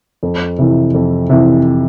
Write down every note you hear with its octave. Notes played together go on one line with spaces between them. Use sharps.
F2
C3 E3
F2
C3 E3